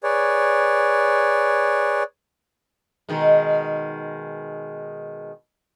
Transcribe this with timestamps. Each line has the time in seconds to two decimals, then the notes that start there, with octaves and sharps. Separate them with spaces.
0.03 G#4 B4 C#5 D5
3.09 B2 D#3 G#3